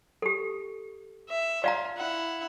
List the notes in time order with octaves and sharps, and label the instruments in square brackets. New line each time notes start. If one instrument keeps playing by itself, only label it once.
[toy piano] G4 A4
[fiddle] E5
[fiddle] F4 [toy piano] D5 F5 A#5
[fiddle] E4 F#5